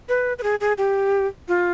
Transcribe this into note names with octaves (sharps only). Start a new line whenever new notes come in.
B4
B4
G#4
G#4
G4
F4